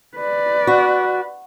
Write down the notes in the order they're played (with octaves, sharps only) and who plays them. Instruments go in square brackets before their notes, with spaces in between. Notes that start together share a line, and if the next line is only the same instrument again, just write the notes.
[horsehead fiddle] B4 D5
[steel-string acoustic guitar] F#4